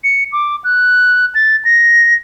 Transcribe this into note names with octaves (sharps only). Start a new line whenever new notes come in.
C#7
D6
F#6
A6
A#6